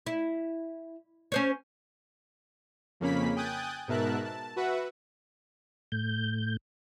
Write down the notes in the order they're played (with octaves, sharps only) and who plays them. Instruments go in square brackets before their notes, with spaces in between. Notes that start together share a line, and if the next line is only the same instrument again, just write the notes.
[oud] E4
C#4 C5 C#5
[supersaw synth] F2 C#3 A#3 C#4 B5 B6
G5 G#5 D#6 F#6 G6 A6
G#2 B2 A#4 E5 A5 F#6
A5
F#4 B4 E5 F#5
[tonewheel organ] A2 G6